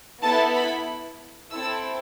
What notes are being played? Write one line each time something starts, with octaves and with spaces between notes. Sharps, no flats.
B3 E4 A4 A5
B5
C4 E4 A4 E6